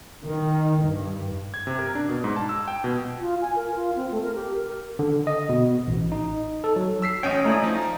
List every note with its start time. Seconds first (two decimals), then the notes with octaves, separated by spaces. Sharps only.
0.23 D#3
0.83 G2
1.54 G#6
1.67 C3
1.79 A#4
1.95 D4
2.09 B2
2.24 G#2
2.36 A5
2.49 E6
2.68 G5
2.84 B2
3.20 F4
3.41 G#5
3.56 A#4
3.75 F4
3.96 C4
4.11 A3
4.23 A#4
4.35 G4
4.54 A#4
4.99 D3
5.27 D#5
5.49 B2
5.87 A1
6.12 D#4
6.64 A4
6.76 F#3
7.02 E6 B6 C7
7.23 A1 C#4 C#5 D#5 G5
7.45 A3 E4 D5 D#5 G#5 A#5
7.63 F3 D#4 A#5